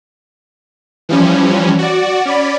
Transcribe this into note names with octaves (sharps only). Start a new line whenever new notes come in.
E3 F3 G3 C#4
F#4 D5
C#4 D5 B5